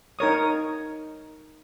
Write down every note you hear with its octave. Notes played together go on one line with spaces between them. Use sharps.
D#4 A#4 C#5 D#6